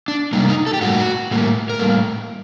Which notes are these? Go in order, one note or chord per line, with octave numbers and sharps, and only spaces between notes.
D4
C3 G3 A#3 D#4
D#4
A4
G4
A2 G3 A#3 F#4
A2 G3 A#3
A#4
A2 G3 A#3 A4